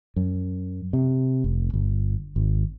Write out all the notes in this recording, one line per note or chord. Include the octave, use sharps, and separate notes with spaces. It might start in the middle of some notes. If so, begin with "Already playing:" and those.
F#2
C3
F1
G1
G#1